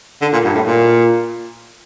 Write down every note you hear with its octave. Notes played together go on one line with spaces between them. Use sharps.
D3
A#2
G2
A2
A#2